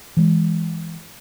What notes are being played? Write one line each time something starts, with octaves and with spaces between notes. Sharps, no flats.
E3 G#3